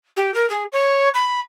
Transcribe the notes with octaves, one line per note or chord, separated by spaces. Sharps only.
G4
A#4
G#4
C#5
B5